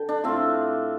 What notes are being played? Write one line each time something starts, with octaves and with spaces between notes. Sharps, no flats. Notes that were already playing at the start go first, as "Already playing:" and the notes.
Already playing: D3 G5
D4
A2 A3 C4 F4